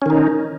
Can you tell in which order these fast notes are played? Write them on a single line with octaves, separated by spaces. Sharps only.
C#4 D#3 D#4